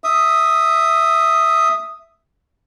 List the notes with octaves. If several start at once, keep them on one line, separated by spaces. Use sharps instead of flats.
E5 D#6